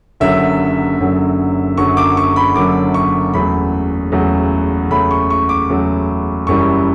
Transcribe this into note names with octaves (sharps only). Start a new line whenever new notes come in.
F#1 F#2 D3 F#3 E5
F#1 F#2 D3 F#3
F#1 F#2 D3 F#3 C#6
D6
C#6
B5
F#1 F#2 D3 F#3 D6
C#6
E2 C#3 F#3 A3 B5
E2 C#3 F#3 A3
E2 C#3 F#3 A3 B5
C#6
C#6
D6
E2 C#3 F#3 A3
F#1 F#2 E3 G3 C#6